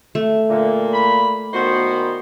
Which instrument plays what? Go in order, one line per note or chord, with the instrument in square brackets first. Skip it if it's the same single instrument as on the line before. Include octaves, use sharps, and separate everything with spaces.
[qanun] A3
[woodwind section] A#2 A#3 [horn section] D3
[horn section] B5
[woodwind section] A#2 D#3 B3 [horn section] E4 F#4 C5